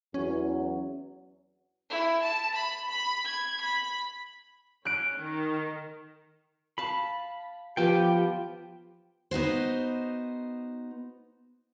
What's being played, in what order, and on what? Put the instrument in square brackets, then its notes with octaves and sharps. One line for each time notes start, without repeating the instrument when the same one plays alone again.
[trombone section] E2 F#3 [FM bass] C#4
[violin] E4
A5
B5
B5
G#6
B5
[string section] C#4 [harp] F#6 D7
[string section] D#3
[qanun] F5 A5 [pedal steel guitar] B5
[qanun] F3 B3 [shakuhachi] G4 [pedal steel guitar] G5
[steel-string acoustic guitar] B3 D#4 F#4 C5